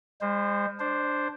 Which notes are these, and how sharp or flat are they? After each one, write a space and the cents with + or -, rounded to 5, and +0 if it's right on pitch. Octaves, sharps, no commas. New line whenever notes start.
G#3 -40 C5 +0
D4 +0 C5 +0